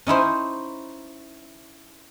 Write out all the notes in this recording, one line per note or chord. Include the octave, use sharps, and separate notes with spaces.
C#4 D#4 E4 C5